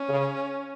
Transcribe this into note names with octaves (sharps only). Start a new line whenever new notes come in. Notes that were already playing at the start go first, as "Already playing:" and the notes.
Already playing: C#4
C#3